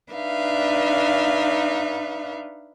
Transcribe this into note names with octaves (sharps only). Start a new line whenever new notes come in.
D4 D#4 B4 E5 F5